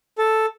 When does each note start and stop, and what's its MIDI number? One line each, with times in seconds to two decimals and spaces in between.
0.18 0.46 69